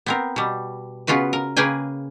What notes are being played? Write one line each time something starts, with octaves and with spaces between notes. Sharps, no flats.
B3 C4 A#4
B2 G3
C#3 B3 F4 F#4 B4
A#4
C#3 A#3 G#4 B4 G5 G#5